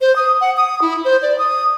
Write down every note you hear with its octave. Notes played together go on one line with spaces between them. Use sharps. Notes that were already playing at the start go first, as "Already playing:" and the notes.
C5
D#6
F#5
D#6
E4
C5
D5
D#6